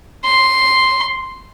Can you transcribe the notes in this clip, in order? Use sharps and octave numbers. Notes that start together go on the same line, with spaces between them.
C6